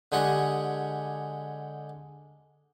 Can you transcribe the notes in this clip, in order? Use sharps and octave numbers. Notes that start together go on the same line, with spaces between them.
D3 G#3 G4 G#4 F#5 C#6